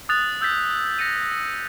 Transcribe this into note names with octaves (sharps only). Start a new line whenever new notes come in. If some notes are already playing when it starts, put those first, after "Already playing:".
D#6 F#6 A6 F7
E6 G6 A6 B6
A#6 C#7 D#7